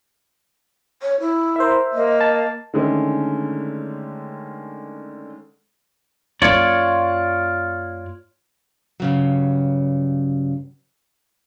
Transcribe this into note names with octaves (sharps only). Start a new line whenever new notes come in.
C#5
E4
A#4 C5 E5
A#3 D#5
A5
D3 D#3 G#3 A3 C#4
F#2 A#3 F4 C#5 D5
G2 C#3 F#3